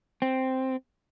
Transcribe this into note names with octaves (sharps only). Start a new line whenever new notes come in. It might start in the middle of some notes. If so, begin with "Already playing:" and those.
C4